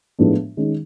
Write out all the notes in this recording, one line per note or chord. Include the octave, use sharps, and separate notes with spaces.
A2 F3 G#3 B3 D4
D#3 G#3 C#4